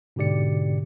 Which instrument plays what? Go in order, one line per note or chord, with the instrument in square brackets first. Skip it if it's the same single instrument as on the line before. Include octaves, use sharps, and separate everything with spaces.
[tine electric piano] G#2 B2 D3 G4 D5 C#7